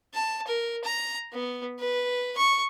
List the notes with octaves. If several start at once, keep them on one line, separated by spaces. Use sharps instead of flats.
A5
A#4
A#5
B3
B4
C#6